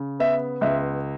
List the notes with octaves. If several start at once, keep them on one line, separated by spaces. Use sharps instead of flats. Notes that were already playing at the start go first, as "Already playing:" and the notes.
Already playing: C#3
B3 E5
C#2 E5